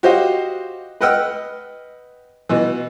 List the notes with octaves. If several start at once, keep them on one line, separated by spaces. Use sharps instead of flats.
F#4 G4 C5 D#5 F5
B4 D#5 F#5 G5 E6 F6
B2 E3